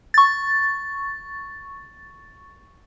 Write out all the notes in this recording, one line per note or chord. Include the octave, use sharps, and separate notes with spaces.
C#6 A6